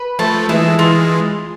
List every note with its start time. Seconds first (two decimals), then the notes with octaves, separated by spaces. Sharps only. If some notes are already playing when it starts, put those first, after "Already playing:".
Already playing: B4
0.19 F3 A3 A5
0.49 E3 G#3 E5
0.79 E3 G#3 F4